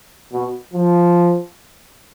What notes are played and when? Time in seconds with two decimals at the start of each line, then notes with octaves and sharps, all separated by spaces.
0.33 B2
0.73 F3